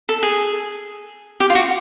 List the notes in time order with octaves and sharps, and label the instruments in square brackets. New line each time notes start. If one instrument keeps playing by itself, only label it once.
[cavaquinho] A4
G#4
G4
F4
F#4